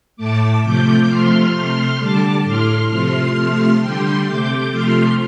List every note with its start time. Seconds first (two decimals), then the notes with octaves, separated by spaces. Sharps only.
0.16 A2 A3 A5 D6
0.63 C3 F3 A3 D6 G6
1.07 C3 F3 A3 C6 F6
1.53 C3 A3 C6 F6
1.99 D3 G3 A5 D6
2.44 A2 A3 C6 F6
2.90 C3 F3 A3 C6 F6
3.36 C3 F3 A3
3.80 D3 G3 G5 C6
4.26 C3 A3 D6 G6
4.71 C3 F3 A3 C6 F6